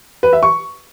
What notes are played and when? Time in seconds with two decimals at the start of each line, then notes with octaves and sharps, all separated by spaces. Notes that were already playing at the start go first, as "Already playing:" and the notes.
0.23 B4
0.33 E5
0.43 C#6